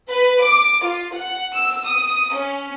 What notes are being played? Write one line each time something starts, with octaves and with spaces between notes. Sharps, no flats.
B4
D6
F4
F#5
E6
D#6
C#4